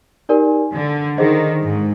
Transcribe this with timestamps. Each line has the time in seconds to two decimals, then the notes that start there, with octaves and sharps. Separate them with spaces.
0.29 D#4 G4 A#4 D5 G#5
0.73 D3
1.18 D#3 G#4 C5 D#5
1.62 G#2